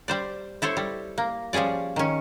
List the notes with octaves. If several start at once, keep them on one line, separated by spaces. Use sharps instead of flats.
G3 C5 D5
E4 A4 C5 C#5
G3
A#3
F3 G3 C#4 G#4 D5
D#3 C#4